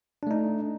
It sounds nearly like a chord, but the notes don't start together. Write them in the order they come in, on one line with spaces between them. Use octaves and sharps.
D4 A3 D#4